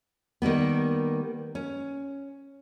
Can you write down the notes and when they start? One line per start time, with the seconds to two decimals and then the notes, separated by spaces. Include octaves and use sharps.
0.42 D#3 G3 A#3 B3
1.55 C#4